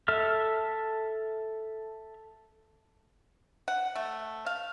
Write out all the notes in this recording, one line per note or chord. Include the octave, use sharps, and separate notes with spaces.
A4 E5 F6
F#5
A3
F5